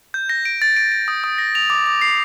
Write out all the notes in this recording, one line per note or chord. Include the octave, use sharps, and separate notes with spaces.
G6
A#6
D7
A6
D7
D7
D#6
D#6
A#6
F7
D6
D6
C7